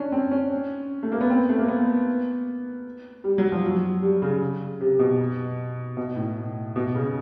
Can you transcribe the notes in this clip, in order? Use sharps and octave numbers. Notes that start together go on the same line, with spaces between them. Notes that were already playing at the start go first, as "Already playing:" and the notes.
Already playing: C#4 D4
C4
C#4
A3
A#3
B3
C4
A3
A#3
B3
G3
F#3
F3
F#3
G3
C#3
C3
B2
B2
A2
B2
C#3